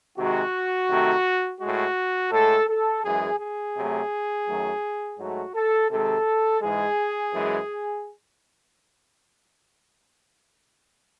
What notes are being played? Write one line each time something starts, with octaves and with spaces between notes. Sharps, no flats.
C3 D#3 G#3 F#4
C3 D#3 A3
A2 G#3 F#4
A2 G#3 A4
A4
F#2 E3 G#3 G#4
G#4
C3 F#3 A3
F#2 D#3 F#3 A3
G#2 F#3 A3 F#4
A4
C3 D#3 G#3 A4
G#2 E3 G#3 G#4
F#2 E3 G#3